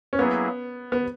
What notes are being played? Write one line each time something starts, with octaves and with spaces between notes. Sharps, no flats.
C#4
F#3 A#3 B3 E4 G#4
B3